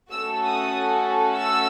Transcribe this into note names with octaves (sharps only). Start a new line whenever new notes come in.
A3 C#4 F#4 A4 E6
D#6
E6